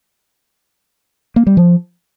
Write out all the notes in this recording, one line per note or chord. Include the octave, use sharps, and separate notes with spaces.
A#3
G3
F3